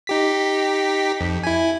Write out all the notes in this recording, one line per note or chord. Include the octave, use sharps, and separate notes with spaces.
D#4 G4 B6
F2
E4 G#5